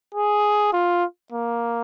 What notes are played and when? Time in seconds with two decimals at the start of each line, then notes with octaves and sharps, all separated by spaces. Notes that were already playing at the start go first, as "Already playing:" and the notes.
0.14 G#4
0.73 F4
1.32 A#3